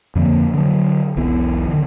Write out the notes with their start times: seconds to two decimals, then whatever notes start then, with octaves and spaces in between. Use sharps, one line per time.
0.15 F2 D3 F3 A#3
0.54 D3 F#3
1.17 E1 B1 E3 B3
1.68 D3 D#3